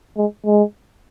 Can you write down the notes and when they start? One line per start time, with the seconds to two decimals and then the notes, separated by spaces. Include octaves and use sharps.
0.17 G#3
0.46 G#3